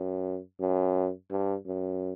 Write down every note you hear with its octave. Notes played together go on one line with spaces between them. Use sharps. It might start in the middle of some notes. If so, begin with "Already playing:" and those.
Already playing: F#2
F#2
G2
F#2